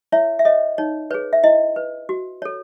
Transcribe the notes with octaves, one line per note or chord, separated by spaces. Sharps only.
E4 C#5 E5
E5
A4 C#5 D#5
D#4 C#5
G#4 B4 C#5
E5
E4 D#5
B4
F#4
A4 C#5